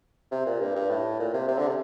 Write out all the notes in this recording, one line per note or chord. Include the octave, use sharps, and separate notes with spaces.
C3
A#2
G2
G2
A2
A#2
C3
C3
D3
C3